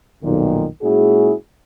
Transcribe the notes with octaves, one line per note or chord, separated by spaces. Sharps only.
B1 F2 A#2 D#3
A#2 G#3 C#4 E4 F#4 G#4